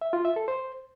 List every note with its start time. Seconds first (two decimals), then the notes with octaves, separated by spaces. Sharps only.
0.01 E5
0.13 F4
0.25 E5
0.36 A4
0.48 C5